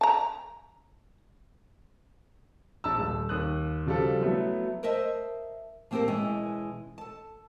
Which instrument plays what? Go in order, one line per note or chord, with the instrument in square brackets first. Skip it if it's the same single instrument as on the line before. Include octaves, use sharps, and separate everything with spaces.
[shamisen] A5 A#5
[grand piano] A#1 A5 E6
D#1
D#2 D#6 F#6
C#3 F3 G3 F#4 A4
F#3 A3 B3 E4
[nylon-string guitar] A#4 C5 D#5 E5 A5
F3 A#3 C4 G4 A4 A#4
B2 E3 G#3 C#4
A4 A5